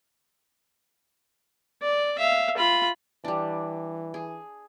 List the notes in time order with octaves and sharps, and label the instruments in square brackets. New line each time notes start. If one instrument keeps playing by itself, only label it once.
[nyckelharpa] D5
E5 F5
F4 B5
[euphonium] E3 [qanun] G3 D4
[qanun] G#4